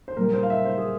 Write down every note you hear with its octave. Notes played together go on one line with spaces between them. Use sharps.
C5
A#2 G3 A#3 A#4
C5
F5
E5
C5
G#4